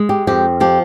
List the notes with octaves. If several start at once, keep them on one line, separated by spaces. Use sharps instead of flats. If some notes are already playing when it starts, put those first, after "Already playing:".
Already playing: G#3
G4
F2 G4
F3 G4